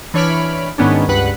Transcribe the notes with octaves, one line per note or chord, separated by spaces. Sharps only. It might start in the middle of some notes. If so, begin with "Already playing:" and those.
E3 D4 C#5 B5 F6 D7
G#2 D#3 B3 C#4 D4
C#2 G2 B4 F#5 B5